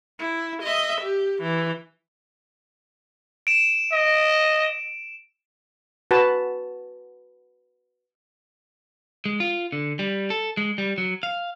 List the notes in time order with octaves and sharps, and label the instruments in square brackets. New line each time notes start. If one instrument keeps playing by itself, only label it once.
[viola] E4
D#5 E5
G4
E3
[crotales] D7 E7
[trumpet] D#5
[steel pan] F#4 B4 A5
[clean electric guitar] G#3
F4
D3
G3
A4
G#3
G3
F#3
F5